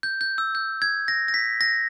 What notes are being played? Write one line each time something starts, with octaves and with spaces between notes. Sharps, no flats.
G6
G6
E6
G6
G#6
A#6
A#6
B6
A#6